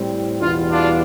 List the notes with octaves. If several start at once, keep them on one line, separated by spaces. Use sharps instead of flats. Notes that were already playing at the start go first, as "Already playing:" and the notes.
Already playing: A2 G3 C4
E2 B2 G3 B3 D4 F4
D4 F4